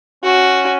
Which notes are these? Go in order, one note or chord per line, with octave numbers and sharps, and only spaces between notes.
C#4 F#4